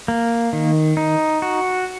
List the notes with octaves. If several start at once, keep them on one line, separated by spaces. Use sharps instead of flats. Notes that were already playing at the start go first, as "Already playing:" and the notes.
A#3
D#3
D#4
F#4